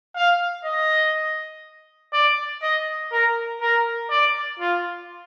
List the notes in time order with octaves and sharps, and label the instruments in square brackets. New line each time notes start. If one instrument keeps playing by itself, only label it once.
[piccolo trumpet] F5
D#5
D5
D#5
A#4
A#4
D5
F4